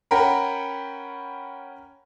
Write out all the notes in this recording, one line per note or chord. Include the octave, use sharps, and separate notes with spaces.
C#4 A#4 F#5 G5 A#5 B5